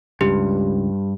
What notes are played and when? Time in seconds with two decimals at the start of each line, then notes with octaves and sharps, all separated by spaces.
0.21 C#2 G2 G4